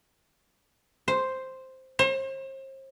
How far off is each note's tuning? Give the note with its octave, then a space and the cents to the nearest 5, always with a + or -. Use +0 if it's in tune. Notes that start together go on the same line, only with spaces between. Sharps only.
C5 +0
C5 +40